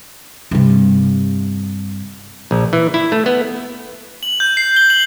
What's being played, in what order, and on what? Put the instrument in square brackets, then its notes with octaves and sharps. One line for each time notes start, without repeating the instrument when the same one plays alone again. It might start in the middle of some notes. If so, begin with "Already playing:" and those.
[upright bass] G2 C3
[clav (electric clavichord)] A#1
E3
E4
A3
B3
[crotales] F#7
G6
C7
G7
F#7